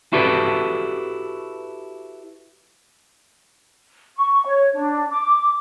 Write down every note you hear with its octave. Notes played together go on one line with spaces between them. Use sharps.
E4 F#4 G4 A4 B4 D5
C#6
C#5
D4
D6